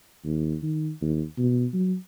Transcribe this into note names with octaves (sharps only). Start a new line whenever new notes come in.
D#2
D#3
D#2
B2
F#3